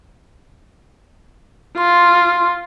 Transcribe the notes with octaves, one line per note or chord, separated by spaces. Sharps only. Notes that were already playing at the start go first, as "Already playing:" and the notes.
F4 C6